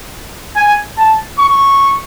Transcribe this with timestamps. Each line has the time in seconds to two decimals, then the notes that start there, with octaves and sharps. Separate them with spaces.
0.56 G#5
0.98 A5
1.39 C#6